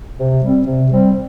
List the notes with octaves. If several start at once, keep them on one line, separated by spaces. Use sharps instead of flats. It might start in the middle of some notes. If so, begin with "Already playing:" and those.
C3
G3 C4
C3
G3 C4